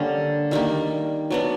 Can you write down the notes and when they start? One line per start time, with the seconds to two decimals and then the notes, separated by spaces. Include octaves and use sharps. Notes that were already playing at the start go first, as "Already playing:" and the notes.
Already playing: D3 G3 A#3 C#4
0.51 D#3 G3 A#3
1.30 F#3 B3 D4